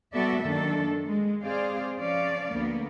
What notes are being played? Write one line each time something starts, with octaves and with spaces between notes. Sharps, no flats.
G3 B3 F#4 A4 D5 E5
F#2 D#3 A#3 D4 A4
G#3
C4 G#4 C5 D5 F5
F3 C#4 D5 F5
D2 A#3 B3